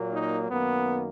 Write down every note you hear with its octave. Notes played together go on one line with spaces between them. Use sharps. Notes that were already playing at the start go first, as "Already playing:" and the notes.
Already playing: A#2 F#3 A#3
D#4
F#2 D#3 A#3 B3